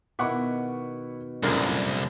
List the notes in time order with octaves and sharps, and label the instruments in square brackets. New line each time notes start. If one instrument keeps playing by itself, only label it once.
[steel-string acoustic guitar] B2 D#3 [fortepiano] E4 F#5 D6 [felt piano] C#6 B6
[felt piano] F1 A#2 C#3 [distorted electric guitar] C2 [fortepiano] F#2 D4 A#4